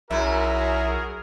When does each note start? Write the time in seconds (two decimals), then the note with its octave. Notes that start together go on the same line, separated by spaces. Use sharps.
0.11 B1 F#2 E4 F#4 G#4 A#4 E5